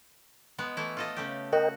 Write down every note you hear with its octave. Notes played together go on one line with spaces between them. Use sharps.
G#3 B3
E3 A3 E4
F4 A4 D#5
C#3 A3 G4
F#4 A#4 D#5 G5